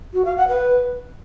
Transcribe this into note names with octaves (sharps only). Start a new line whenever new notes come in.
F#4
F5
F#5
B4